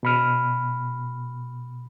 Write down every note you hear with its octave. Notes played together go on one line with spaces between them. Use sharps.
B2 B5 F6